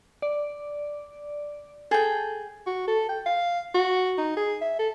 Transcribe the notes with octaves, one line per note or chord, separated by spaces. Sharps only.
D5
G#4 A4 G5
F#4
A4
G5
F5
F#4
D#4
G#4
E5
A4